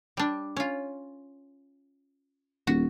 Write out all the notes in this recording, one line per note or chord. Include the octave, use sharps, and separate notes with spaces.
G3 D4
C#4 F4
D#1 F#4